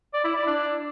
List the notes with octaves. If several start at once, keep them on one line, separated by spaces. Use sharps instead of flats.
D5
E4
D5
D4